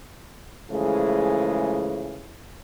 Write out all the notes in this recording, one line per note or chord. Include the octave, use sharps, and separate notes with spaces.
C#3 E3 F3 G#3 A3